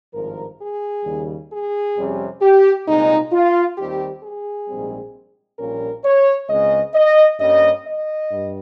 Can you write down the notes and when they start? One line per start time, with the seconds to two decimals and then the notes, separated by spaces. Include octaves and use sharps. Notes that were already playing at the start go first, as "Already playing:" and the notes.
0.14 G#1 G2 F3 A#4
0.60 G#4
1.05 D#2 C#3 G3
1.50 G#4
1.96 F2 C3 G3 C#4
2.41 G4
2.87 C2 A#2 G#3 C4 D#4
3.32 F4
3.77 D#2 D#3 G3 C4 G4
4.22 G#4
4.68 A#1 G#2 G3 C4
5.58 A#1 A#2 G3 A#3 C#4 A#4
6.04 C#5
6.49 C#2 C#3 G#3 C4 D#5
6.94 D#5
7.39 G2 G3 A#3 C#4 D#5
7.85 D#5
8.30 G2 G3